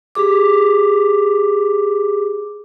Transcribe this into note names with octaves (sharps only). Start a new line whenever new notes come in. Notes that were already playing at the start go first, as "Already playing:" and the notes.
G4 G#4 D6